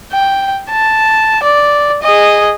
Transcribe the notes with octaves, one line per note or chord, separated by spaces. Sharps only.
G5
A5
D5
G#4 D#5